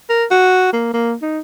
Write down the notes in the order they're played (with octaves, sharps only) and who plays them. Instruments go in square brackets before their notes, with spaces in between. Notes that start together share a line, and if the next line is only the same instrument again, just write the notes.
[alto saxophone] A#4
F#4
A#3
A#3
D#4